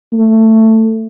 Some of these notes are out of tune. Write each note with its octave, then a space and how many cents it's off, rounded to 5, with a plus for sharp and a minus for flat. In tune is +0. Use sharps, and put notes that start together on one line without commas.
A3 +15